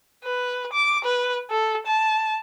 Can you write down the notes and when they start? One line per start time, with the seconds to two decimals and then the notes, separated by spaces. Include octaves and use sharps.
0.24 B4
0.73 D6
1.05 B4
1.50 A4
1.87 A5